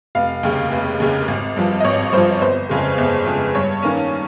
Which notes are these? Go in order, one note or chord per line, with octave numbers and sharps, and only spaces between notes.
F1 F5
D#2 C#3
F1
D#2 C#3
G#1
G2 F3
D#5
G#1 C#5
G2 F3 C5
G1 C5
F2 C#3 G#3
G1
F2 C#3 G#3
G2 C#5
D#3 A#3 C#4